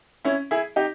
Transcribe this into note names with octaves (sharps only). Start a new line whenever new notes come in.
C#4 E4
E4 G#4
D#4 G4